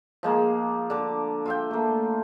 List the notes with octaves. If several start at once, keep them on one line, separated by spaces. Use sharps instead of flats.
F3 G#3 A#3
D3 D6
F4 E5 G5
A3 A#3